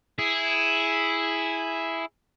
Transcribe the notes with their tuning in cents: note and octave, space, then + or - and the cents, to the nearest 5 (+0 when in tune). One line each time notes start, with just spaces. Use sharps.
E4 +0 G#4 +0